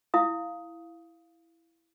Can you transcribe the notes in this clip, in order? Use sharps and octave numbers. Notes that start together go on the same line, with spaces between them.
E4 F5 D#6